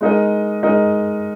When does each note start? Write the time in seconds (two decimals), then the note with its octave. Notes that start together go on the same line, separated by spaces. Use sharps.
0.01 G#3 D#4 A#4 D#5
0.63 G#3 D#4 A#4 D#5